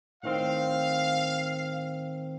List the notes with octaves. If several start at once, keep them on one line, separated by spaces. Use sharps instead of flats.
A2 D#3 C4 F5